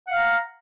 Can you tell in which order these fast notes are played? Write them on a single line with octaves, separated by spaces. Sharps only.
F#5 F5 F6 A#5